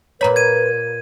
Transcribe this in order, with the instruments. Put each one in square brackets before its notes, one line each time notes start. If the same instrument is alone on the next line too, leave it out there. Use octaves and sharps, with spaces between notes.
[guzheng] A#2 B5 [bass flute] B4 [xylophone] C#5 A#5
[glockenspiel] G#6 D#7